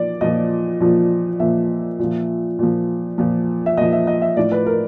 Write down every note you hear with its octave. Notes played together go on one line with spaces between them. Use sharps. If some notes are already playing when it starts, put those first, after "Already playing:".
Already playing: A#2 F3 D5
A#2 F3 D#5
A#2 F3
A#2 F3 E5
A#2 F3
A#2 F3
A#2 F3
E5
A#2 F3 D#5
E5
D#5
E5
A2 F3 D5
B4
A#4